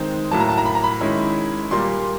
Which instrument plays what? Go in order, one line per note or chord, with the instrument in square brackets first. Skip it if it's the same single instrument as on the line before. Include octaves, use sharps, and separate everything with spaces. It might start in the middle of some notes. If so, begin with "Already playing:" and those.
Already playing: [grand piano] D#3 G#3 C4 D#4
A2 F#3 A#3 A5
A#5
A5
A#5
B5
A#5
B5
D#3 G#3 C#4 E4
A#2 G3 A#3 C6